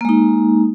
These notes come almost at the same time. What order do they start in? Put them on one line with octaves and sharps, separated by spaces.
A#3 G#3 D#4